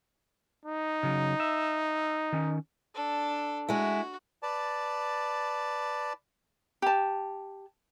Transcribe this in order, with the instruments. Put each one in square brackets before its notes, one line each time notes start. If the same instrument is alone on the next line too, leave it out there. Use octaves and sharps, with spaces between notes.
[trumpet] D#4
[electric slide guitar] C#3 F#3
E5
D#3 C#4
[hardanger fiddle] D4 A4
[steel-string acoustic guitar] G#3 E4 [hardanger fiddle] F#4
[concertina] B4 D5 A5
[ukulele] G4 A5